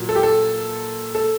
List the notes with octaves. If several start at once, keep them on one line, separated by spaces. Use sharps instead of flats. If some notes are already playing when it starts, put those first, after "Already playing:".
Already playing: A#2 F#3
A4
G4
A4
A4